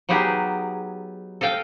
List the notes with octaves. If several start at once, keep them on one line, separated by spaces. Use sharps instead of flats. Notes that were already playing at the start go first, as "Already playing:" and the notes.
F#3 B3 D#4 G4 G#4
A4 D#5 F5 G5